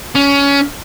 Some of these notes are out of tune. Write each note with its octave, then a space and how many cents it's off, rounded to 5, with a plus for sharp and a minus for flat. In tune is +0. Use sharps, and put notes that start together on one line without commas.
C#4 +20